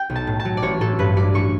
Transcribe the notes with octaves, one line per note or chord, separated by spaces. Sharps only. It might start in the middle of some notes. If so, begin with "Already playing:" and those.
Already playing: G5
B1
A5
A2
A5
F#3
D5
A1 C#5
A1 A4
G2 B4
F#3 D5
A1 C#6